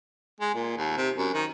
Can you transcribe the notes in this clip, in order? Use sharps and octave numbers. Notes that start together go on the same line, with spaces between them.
G#3
A#2
D#2
C3
F#2
D#3